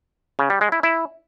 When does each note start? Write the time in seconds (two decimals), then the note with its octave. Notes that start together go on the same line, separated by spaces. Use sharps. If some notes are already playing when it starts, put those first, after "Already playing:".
0.39 C#3
0.50 G3
0.61 G#3
0.72 E4
0.83 E4